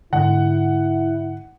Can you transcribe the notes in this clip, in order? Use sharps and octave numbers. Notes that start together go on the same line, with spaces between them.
G#2 D3 E4 F#5